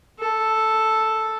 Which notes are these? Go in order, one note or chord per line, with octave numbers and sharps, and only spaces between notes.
A4